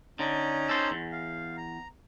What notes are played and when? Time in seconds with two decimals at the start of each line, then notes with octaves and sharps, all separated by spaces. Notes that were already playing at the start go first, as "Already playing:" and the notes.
0.19 D3 C#4 D#4 A#5
0.69 A4 C5
0.91 E2
1.12 F5
1.57 A#5